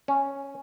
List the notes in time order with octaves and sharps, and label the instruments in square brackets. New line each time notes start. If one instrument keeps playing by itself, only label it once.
[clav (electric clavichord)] C#4